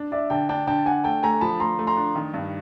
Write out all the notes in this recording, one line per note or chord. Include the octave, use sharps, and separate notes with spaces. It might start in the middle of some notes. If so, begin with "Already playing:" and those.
Already playing: D4
D4 D5 E5
D3 G5 A5
D4 G5 A5
D3 G5 A5
D4 F#5 G#5
A3 G5 A5
A3 G#5 A#5
F3 A5 B5
A3 A#5 C6
A3
A#5 C6
D4
D#3
G2